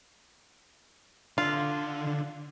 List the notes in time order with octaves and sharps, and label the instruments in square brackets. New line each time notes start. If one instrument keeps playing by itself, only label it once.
[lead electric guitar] D3 D4 [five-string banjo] F4